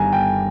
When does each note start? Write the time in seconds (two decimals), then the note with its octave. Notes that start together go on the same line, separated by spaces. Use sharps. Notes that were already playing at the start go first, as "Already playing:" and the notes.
Already playing: G1 G2 D#3 G#5 A#5
0.12 G5